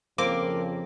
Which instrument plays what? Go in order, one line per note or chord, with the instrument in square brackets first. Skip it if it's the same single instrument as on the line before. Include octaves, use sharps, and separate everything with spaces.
[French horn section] F2 C#3 F3 [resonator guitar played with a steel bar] A#3 [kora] C4 [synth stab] D6